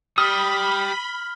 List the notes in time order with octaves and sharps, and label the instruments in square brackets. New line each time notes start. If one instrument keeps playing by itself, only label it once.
[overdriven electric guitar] G3 [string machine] B5 [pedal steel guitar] D#6 [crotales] F6